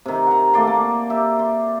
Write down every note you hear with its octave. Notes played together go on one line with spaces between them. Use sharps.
C3 D#3
F#5 A#5
A3 A#3 D5 C6
A#3
G4 E5
C6